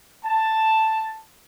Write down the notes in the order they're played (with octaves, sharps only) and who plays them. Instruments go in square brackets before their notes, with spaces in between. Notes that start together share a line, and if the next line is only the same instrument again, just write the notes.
[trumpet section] A5